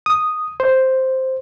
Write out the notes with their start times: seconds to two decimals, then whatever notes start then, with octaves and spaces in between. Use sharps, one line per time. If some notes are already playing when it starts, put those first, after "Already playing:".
0.06 D#6
0.60 C5